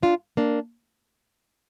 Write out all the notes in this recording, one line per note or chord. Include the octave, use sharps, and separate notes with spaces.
D4 F4
A#3 D4